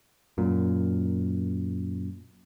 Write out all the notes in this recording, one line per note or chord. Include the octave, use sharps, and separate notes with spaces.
F#2 A#2